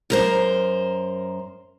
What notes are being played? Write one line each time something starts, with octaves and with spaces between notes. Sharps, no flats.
F#2 A#4 C5